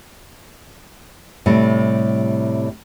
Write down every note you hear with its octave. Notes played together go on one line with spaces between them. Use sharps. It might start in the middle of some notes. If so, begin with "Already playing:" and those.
A2 C3 G3